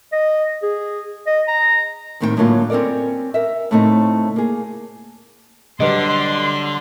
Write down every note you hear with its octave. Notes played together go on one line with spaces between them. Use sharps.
D#5
G#4
D#5
A#5
D#2 A2 D#3 C4 G#4 G5
A2 D3 F#3 A#3 C#4 F4
C4 C#4 A4 A#4 D5
A#4 E5
A2 C#3 A3 C4 D#4
A#3 G#4
D3 F#3 G3 D4 B4 D#5 C6